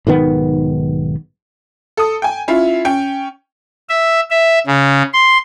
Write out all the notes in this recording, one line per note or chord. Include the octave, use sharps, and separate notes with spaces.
B1 G#2 D#3 B3
A4 D#6
G5 G#5
C#4 E4 F4
C#4 G5
E5
E5
C#3
C6